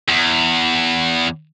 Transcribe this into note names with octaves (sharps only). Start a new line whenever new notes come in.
E2